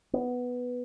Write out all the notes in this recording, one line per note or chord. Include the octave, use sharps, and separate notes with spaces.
B3